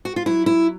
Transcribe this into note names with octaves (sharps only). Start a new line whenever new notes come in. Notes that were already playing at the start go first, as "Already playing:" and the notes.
F#4
F4
F#3 E4
E4